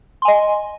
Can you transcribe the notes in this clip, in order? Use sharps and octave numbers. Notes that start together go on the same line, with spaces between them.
D#5 G#5 C6